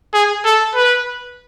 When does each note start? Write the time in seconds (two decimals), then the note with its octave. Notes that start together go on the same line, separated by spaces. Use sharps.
0.14 G#4
0.45 A4
0.75 B4